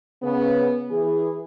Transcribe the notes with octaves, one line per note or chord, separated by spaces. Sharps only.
C#3 B3
E3 G#4